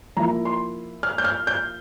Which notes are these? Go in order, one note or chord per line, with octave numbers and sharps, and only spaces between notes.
F3 A#3 E4 A#5
C6
F6
G6
F6
G6